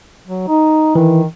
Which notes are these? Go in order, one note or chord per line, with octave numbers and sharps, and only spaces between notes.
F#3
D#4
D#3 E3